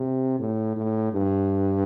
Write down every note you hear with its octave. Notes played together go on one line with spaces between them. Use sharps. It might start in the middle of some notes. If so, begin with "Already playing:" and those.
Already playing: C3
A2
A2
G2